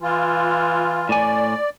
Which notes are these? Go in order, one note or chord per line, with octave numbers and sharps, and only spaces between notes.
E3 F4
A2 D5 G#5